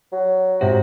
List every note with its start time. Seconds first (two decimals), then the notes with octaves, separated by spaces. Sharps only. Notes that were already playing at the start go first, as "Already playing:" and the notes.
0.12 F#3
0.61 G#2 C3 F#4